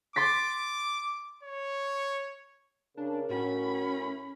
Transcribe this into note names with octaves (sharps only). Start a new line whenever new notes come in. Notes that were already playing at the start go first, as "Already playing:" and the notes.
C6 D6 A6 B6
C#5
C#3 D4 A#4
A2 C#4 F#4 B5